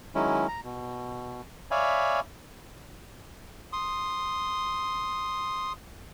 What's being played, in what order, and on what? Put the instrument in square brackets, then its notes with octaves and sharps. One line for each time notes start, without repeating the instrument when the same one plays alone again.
[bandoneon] D#3 F#3 G#3 C#4 E4
A#5
B2
C#5 D5 E5 F5 G#5 B5
[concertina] C6 D#6